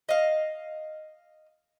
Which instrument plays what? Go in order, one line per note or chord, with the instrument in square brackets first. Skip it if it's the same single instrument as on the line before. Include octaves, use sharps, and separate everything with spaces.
[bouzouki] D#5 F5